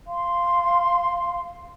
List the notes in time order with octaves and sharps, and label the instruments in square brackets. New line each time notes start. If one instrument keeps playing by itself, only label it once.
[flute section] F5 C6